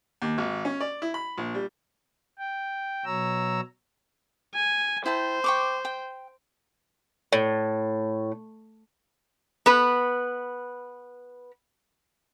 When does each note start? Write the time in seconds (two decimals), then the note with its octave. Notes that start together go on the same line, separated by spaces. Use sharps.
0.22 D#2
0.38 G#1
0.65 C#4
0.80 D5
1.02 E4
1.14 B5
1.38 A#1
1.55 G3
2.38 G5
3.05 B2 F#3 C#5 A#5 E6
4.55 G#5
5.06 E4 C5 G5 A5
5.44 G5 C#6 D6
5.85 G5
7.33 A2
9.66 B3 B4